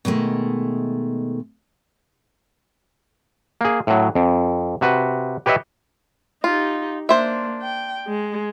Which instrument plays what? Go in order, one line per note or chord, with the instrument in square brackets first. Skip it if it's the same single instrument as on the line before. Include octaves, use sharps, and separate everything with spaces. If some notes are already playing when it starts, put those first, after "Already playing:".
[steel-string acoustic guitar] B2 D#3 G#3 A3
[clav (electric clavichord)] A#3 G#4
A2 F#3
F2
C3 F#4 B4
G4 B4 C#5 D#5 E5
[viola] D#4 G4 [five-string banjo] F4
[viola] A#3 [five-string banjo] D4 C5 E5
[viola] G5
G#3